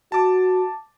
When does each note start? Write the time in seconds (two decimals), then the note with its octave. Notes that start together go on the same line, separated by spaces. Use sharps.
0.12 F#4 A5 D6